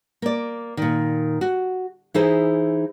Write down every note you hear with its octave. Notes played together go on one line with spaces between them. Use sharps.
A#3 D5
A#2 D#3
F#4
E3 D#4 E4 G#4 C5